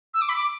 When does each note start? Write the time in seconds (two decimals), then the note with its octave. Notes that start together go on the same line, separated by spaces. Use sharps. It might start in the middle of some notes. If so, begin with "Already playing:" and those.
0.14 E6
0.22 D6
0.29 B5
0.36 D6